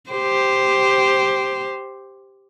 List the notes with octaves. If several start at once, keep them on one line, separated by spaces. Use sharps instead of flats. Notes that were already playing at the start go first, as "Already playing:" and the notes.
G4 C5